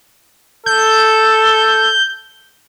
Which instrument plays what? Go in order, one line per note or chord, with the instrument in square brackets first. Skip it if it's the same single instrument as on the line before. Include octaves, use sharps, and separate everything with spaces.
[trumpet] A4 [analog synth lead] G6